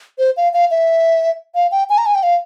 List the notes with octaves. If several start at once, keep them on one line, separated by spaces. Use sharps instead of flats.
C5
F5
F5
E5
F5
G5
G#5
A#5
G#5
G5
F5